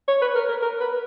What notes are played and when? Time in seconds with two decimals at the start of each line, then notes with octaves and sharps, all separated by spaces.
0.08 C#5
0.22 B4
0.35 A#4
0.49 A#4
0.62 A#4
0.81 B4